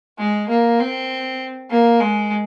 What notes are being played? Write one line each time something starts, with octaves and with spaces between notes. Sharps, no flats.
G#3
A#3
C4
A#3
G#3